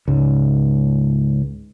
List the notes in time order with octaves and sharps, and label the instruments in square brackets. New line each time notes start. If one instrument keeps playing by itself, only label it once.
[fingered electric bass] C#2 G#2